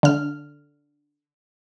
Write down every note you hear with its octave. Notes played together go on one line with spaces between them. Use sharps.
D3 F6